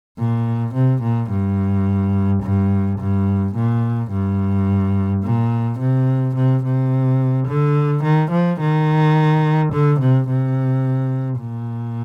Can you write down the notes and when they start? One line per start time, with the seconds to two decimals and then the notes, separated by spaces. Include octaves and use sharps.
0.19 A#2
0.75 C3
1.02 A#2
1.30 G2
2.43 G2
2.99 G2
3.56 A#2
4.12 G2
5.23 A#2
5.79 C3
6.35 C3
6.64 C3
7.48 D3
8.04 D#3
8.32 F3
8.60 D#3
9.73 D3
10.00 C3
10.29 C3
11.40 A#2